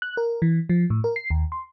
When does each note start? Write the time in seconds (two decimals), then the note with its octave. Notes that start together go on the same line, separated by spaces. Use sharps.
0.02 F#6
0.17 A#4
0.42 E3
0.69 F3
0.90 A2
1.04 A#4
1.16 C7
1.30 D#2
1.52 C6